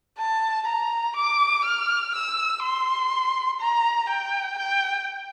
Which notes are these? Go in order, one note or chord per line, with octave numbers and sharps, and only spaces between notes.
A5
A#5
D6
F6
E6
C6
A#5
G5
G5